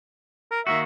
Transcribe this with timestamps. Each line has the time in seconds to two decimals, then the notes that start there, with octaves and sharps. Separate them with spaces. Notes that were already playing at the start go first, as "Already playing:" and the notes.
0.51 A#4
0.67 D#3 A#3 F#4 E5